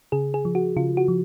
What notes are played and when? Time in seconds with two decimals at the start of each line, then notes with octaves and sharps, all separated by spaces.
0.12 C#3 G#4
0.34 G#4
0.45 F3
0.55 F#4
0.76 C#3 F4
0.97 F#4
1.08 F3